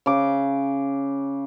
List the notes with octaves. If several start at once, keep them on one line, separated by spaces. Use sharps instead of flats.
C#3 D6